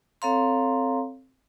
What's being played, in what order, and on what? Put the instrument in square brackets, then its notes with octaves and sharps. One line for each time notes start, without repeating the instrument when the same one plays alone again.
[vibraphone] C4 A4 C#5 F5 A#5 C6